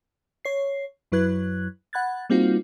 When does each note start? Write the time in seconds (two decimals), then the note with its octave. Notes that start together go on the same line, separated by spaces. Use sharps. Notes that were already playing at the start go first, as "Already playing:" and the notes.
0.45 C#5 C7
1.12 F#2 F#3 E4 B4 F#6 G#6
1.93 F#5 B5 F#6 G#6 A6
2.30 G3 A#3 C4 D#4 F4 F#4